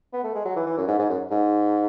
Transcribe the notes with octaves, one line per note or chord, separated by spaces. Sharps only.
B3
A3
G#3
F#3
E3
E3
F#2
G#2
G#2
F#2
G#2